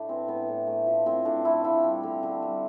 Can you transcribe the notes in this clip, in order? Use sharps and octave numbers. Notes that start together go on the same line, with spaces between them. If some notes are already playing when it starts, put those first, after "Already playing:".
Already playing: A2 A3 D4 E4
E3 C4
A2 B3
A2
A3
F3
A2 C4
A2 D4
A3 E4
F3 E4
G3
D3
D3
G3